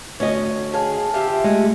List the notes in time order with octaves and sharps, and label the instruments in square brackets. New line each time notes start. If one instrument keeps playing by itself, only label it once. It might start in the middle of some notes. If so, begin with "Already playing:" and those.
[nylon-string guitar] D2 D#5 [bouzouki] C#4
[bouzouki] G#4 F5 [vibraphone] A5
[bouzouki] F4 G4 E5
[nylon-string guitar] G#3 [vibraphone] A3